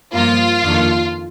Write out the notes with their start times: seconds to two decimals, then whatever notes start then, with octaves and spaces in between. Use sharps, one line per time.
0.13 G2 F3 A#3 F4
0.63 F2 D#3 A#3 D4